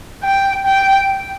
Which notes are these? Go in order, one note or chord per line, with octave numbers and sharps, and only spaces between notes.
G5
G5